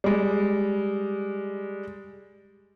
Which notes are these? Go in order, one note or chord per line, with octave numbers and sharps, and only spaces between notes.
G3 G#3